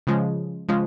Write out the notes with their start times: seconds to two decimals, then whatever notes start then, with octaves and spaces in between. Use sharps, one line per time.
0.07 C#3 F3 G#3
0.69 C#3 F3 G#3